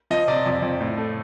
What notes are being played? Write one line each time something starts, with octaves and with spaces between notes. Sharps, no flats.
F3 D#5
C3 D5
F2
F2
A2
A3